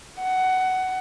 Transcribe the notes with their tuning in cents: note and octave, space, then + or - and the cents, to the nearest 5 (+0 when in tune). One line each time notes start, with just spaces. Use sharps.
F#5 +15